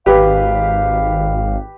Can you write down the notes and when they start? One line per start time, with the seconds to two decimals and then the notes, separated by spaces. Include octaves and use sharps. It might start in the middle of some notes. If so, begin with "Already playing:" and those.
0.06 G#1 G4 B4 F5